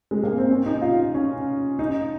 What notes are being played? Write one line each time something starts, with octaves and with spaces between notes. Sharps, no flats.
G#3
A#3
C4
C#4
D#4
F4
C#4
D#4